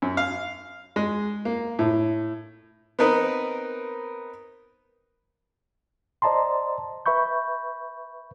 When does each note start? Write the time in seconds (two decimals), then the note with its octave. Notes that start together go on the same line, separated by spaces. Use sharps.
0.02 F#2
0.17 F5
0.96 G#3
1.45 A#3
1.79 A2
2.99 B3 C4 D#4 A#4 B4
6.22 C5 D5 D#5 A5 A#5 C6
7.06 B4 E5 B5 C#6 G6